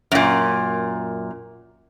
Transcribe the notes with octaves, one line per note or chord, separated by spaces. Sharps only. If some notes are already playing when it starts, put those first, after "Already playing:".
F#2 A#2